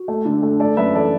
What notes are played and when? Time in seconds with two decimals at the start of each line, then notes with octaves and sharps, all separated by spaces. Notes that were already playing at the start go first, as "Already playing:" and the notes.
Already playing: F#4
0.08 A3
0.25 D3
0.42 A3
0.60 A3 A4 D5
0.77 F#2 B4 E5
0.95 E3 A4 D5